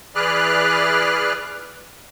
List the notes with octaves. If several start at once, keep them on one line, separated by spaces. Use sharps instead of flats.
E3 G#4 B4 D5 F6 F#6